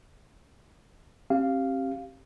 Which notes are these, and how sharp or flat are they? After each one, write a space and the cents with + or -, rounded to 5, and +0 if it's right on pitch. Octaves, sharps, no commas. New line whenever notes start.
C4 +40 G4 -15 F5 -5